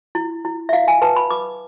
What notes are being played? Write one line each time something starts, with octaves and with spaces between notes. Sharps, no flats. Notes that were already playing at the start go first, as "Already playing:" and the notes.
E4
E4
E5
E4 F5
G#5
B4 A5
B5
B4 D6